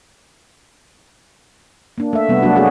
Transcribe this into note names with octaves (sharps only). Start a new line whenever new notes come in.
A#3 D4
A3 E5
C3 G3 B3
F#3 A#3 D4 F#4
A3 C4 D4 F#4 G#4